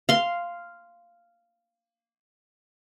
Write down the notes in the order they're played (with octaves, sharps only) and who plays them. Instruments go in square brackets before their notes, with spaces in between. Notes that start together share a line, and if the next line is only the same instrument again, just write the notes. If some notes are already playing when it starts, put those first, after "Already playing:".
[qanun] F5 C6